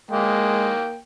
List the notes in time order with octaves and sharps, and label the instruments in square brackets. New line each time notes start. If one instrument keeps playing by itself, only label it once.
[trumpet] G#3 [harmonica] A#3 G5